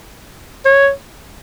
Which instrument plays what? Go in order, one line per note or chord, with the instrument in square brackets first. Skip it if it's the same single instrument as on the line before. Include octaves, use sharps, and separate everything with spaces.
[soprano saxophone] C#5